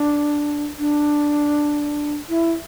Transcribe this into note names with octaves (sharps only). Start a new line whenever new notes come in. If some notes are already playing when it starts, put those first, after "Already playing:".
Already playing: D4
D4
E4